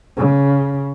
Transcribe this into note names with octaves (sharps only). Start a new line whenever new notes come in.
C#3